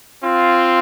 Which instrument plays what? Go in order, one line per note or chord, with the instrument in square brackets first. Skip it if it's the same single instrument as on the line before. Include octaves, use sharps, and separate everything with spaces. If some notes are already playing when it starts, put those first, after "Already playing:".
[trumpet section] C4 F4